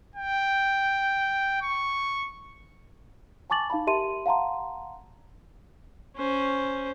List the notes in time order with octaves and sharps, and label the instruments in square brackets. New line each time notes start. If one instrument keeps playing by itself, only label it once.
[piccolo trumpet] G5
C#6
[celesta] G#5 A5 C#6 D6 A6 F#7
D#4 F5 A5 B5
G4 A#4 E5 A5 C6 D#7
F5 F#5 A5 A#5 C6
[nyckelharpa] C#4 C5